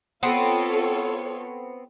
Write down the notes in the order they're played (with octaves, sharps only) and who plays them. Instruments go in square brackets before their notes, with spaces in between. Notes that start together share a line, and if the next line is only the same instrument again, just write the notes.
[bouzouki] B3 C4 [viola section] F4 A4 C#5